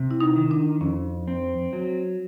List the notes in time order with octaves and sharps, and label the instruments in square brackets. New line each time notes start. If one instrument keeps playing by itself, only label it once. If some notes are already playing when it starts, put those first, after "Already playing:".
Already playing: [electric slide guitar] C3
[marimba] E4
D#4
[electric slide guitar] D#3
[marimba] D4
[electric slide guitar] F2 [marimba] C#4
[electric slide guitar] C4
F#3